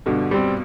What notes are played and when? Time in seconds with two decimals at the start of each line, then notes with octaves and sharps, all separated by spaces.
0.06 G2 B2 D3
0.31 G3 C4